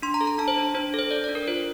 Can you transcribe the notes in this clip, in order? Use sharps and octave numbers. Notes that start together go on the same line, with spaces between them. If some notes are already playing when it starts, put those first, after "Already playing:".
D4 C6
A#5
A4
A#5
D4 A5
C5
D4
D4 C5
A4 C5
A4 D5
D5
D4
A#4
F4 C5